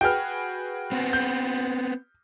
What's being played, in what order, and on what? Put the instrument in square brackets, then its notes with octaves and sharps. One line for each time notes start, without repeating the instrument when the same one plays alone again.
[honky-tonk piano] F#4 G#4 B4 [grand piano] G5 F6
[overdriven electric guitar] B3 C4
[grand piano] G6